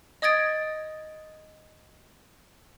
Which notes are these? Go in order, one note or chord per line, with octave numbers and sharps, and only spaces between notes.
D#5 D#6 G#6 A6 D7